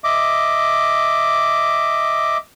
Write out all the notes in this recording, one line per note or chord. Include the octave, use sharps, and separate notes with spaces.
D#5 E5 D6